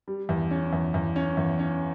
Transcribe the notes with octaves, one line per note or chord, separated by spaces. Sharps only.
G3
E2
C#4
E2
E2
C#4
E2
C#4